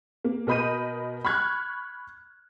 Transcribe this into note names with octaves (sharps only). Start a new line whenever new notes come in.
A#3
B2 A#4 D#5 B5 G6 D#7
B5 C#6 F6 F#6 G#6